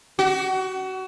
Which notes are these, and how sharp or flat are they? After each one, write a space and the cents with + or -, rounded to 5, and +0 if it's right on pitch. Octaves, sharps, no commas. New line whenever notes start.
F#4 +25